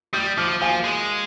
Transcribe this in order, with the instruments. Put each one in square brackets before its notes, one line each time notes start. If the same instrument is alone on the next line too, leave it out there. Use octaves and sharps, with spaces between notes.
[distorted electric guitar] G3 [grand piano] D#6 G6
[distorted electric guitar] F3 [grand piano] D6 F6
[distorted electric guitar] F3 [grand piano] F5 G#5
[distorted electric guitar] G#3